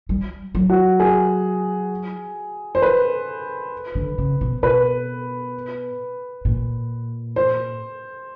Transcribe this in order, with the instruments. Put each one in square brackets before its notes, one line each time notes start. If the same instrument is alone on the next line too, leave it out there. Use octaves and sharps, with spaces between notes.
[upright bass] G3
F#3
[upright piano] F#4
G#4
C5
B4
[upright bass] D3
C#3
B2
[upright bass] B2 [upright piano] B4
[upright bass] A#2
[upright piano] C5